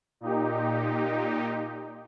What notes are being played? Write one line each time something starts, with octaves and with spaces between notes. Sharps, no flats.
A#2 D#4 G4